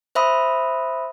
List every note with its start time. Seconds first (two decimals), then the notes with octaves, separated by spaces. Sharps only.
0.15 C5 E5 B5 D#6